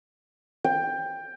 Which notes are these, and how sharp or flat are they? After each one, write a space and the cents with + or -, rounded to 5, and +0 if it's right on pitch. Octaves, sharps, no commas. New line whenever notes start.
G5 +15